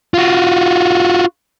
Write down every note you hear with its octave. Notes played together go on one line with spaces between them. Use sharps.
F4 F#4